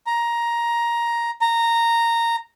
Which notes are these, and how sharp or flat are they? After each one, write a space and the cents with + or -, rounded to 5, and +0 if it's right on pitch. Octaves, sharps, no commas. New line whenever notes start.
A#5 +10
A#5 -10